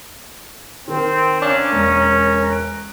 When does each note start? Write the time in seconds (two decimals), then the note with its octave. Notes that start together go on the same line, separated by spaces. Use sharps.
0.88 D#3 C4 A#4
1.42 C#4 D4 C#5 F5 A#5
1.72 E1 A#4 D#6 A#6
2.49 F#6 D7